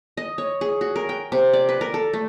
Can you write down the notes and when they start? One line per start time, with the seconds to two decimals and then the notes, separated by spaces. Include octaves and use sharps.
0.17 D#5
0.38 C#5
0.61 G#4
0.81 F#4
0.96 A#4
1.09 G5
1.32 C3
1.53 D5
1.69 B4
1.81 A#4
1.94 A4
2.13 A3